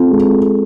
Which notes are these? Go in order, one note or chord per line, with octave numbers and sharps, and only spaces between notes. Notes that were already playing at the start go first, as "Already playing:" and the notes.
Already playing: C4 F4 A4
G#3